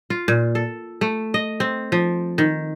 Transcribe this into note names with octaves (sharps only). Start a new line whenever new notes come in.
F4
A#2
A4
A3
D#5
C4
F3
D#3